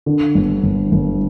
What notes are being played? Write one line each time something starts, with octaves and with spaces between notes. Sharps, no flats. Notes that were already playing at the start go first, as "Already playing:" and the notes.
D3
G1
G1
G1